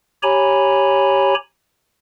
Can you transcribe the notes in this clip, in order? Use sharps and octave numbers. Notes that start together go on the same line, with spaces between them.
G4 C#5 G#5 A#5 B5